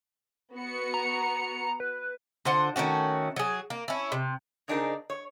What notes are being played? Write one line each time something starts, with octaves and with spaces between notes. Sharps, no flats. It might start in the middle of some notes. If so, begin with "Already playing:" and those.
B3 F#4 C#7
A#5
B4
D3 F4 C5 F#5
D#3 A3 C#4 F#4
F#3 G#4
A#3
C#4 E4
C3
C#3 C4 D4 D#4 G#4 A#4
C#5